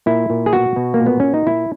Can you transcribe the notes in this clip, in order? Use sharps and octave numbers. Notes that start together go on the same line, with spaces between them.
A#2 E4
A#2
G#4
B2 F#4
B2
A#3
A#2
B3
A#2 C#4
D#4
A#2 E4